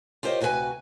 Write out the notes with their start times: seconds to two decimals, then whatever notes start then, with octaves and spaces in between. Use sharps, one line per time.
0.23 F4 G4 A#4 C5 C#5 D#5
0.40 D2 C3 F#4 A4 B4 G#5